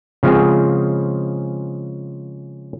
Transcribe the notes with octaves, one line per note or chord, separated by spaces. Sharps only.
C#3 F3 G#3 C4 G#4